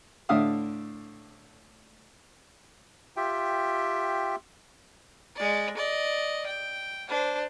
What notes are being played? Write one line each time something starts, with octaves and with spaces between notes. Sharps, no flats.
A2 D3 D4 E5 F5 D#6
F4 G4 E5 G5
G#3 D5
D5 D#5
G5
D4 C5